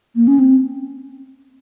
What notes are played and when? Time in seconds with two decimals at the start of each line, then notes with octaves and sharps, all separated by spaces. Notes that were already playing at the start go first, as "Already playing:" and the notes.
0.16 A#3
0.27 C#4
0.39 C4